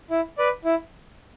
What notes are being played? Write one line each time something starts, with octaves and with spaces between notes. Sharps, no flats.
E4
B4 D5
E4